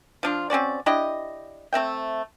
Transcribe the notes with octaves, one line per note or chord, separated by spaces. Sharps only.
F3 D4 F4
C4 C#4 F#4 D5
D4 E4 G4 D#5
A3 C4 E5 G5